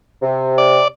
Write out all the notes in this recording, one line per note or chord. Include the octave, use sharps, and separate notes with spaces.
C3
D5